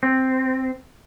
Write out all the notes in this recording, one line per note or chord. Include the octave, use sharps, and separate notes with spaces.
C4